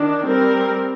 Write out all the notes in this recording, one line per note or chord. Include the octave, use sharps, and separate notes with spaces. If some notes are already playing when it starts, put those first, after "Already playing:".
Already playing: D#3 D4
G3 C4 A#4